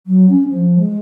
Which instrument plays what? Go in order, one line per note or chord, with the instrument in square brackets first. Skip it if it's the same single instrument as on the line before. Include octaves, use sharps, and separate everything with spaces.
[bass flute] F#3
C#4
F3
G#3